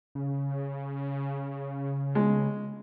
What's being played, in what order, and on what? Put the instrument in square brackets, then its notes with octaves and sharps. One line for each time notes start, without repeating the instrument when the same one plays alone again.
[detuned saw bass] C#3
[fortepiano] G#3